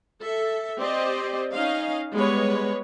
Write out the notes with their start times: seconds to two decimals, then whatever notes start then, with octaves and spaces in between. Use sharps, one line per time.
0.21 A4 E5
0.79 C4 G4 C5 D5 D#5
1.53 C#4 D#4 D#5 F5
2.13 G3 G#3 B3 B4 C#5